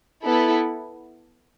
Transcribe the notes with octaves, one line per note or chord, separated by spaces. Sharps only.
B3 E4 A4